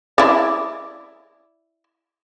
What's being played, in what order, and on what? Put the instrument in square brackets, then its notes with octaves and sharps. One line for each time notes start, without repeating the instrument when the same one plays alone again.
[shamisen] E4 D5